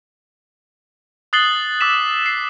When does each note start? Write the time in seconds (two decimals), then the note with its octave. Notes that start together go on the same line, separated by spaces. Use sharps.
1.33 D#6 F#6 A6 C7 F#7 G7
1.81 D6 E6 B6 E7
2.26 C7